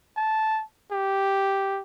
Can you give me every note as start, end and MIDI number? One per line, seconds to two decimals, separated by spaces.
0.17 0.63 81
0.92 1.82 67